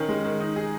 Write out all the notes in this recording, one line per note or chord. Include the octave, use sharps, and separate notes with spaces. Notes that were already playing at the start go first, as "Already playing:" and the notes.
Already playing: D#3 C#4
G#3
D#3
D#4
G#4